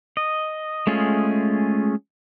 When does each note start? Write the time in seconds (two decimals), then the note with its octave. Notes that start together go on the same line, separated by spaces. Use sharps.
0.17 D#5
0.87 G#3 A3 C#4 F4 G#4